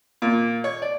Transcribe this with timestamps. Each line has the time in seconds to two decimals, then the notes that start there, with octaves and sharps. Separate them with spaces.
0.22 A#2
0.64 C#5
0.82 D5